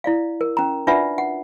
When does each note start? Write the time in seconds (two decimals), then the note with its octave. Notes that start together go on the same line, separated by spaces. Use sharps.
0.04 E4 D5 F5
0.41 A#4
0.57 C#4 A#5
0.87 D4 F4 B4 D5 E5 F#5
1.18 F#5